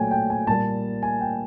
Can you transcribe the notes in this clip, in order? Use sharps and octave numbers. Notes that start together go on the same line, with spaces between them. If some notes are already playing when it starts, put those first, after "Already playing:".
Already playing: A#2 F#3 A3 C#5 G5 G#5
G5
G#5
A#2 G3 A#3 A5
G#5
G5